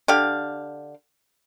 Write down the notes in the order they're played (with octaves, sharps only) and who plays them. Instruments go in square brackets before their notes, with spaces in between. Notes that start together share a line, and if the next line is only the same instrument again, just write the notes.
[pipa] D3 G4 F5